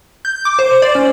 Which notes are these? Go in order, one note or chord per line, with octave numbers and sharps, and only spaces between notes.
G6
D6
C5
D5
C#4